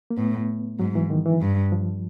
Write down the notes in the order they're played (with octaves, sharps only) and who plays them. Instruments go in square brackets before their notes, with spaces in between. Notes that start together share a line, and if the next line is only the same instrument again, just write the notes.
[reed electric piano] A#3
[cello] A2 [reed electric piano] B3
[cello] G#2 [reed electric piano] F#3
[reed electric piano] E3
D#3
E3
[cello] G2
[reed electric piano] F3